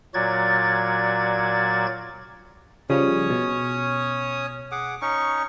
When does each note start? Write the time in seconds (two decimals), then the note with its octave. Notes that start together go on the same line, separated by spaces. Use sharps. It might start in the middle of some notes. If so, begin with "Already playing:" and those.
0.14 A#2 F#3 F#4 D5 G#6 A6
2.90 C#3 F3 G3 C#4 C#5 D#6
3.30 B2
4.72 G#4 F#5 D6
5.01 C#4 D#4 C#6